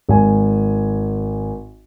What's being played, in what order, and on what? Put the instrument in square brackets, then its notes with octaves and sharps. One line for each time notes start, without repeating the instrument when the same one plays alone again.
[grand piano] G#1 G#5